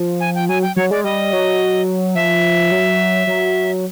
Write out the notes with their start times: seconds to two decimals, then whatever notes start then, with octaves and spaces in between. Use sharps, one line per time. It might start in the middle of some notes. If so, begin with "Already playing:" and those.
Already playing: F3
0.20 G#5
0.35 G5
0.49 F#3 G#5
0.62 G5
0.76 F#3 C#5
0.91 G#3 D5
1.04 G3 D#5
1.33 F#3
2.15 F3 E5
2.71 F#3
3.27 F#3